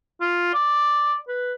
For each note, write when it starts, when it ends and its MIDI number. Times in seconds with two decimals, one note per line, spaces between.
0.21 0.51 65
0.54 1.17 74
1.28 1.53 71